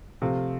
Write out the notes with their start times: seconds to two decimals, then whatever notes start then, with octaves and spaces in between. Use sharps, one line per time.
0.22 C3 F3 A3 F4